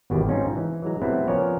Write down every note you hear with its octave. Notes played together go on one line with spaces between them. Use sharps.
G#1 E2 B2 D#3 G4 B4
G#2 B2 C4 C#4 D#4 F4
E3
E3 F#3 G#3 A#5
C3 F#3 A3 B3 C4 E4
F3 B3 C#4 A#4 C#5 D5